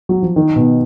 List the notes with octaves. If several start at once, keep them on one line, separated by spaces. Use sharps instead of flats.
F#3
F3
D#3
B2